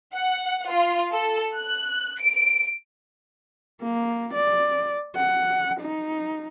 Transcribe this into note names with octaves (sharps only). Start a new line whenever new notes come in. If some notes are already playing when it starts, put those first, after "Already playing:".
F#5
F4
A4
F#6
D7
A#3
D5
F#5
D#4